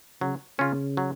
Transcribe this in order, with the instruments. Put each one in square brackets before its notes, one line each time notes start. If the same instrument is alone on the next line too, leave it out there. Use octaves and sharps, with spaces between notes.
[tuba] C#3 [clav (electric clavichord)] F#3
[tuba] C#3 [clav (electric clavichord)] C#4 F4
[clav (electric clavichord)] F#3